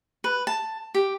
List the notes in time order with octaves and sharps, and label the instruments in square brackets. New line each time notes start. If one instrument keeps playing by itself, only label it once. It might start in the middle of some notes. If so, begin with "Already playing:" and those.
[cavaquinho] B4
A5
G4